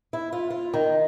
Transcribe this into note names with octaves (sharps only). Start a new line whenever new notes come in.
E4
F4
F4
D#3